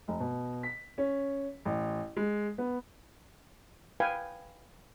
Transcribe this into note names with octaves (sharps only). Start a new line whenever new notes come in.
F1
B2
B6
C#4
A1
G#3
B3
B4 F5 G5 G#5